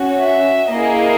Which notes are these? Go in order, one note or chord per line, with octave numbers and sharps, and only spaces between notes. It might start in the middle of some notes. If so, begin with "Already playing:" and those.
Already playing: C#4 F#4
E5
A#3 E4 G#4 D#5